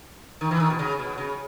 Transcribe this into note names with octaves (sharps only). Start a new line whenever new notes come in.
D#3
E3
D#3
B2
C#3
B2
C#3